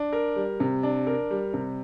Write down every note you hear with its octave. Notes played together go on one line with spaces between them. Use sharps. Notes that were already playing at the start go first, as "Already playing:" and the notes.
Already playing: D4
A#4
G3
C3
D4
A#4
G3
C3